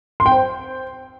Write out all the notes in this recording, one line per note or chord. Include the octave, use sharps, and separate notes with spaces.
C6
G5
C5